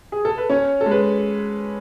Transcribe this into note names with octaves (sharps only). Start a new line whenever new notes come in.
G#4
A4
B4
C#4 C#5
A4
G#3
B4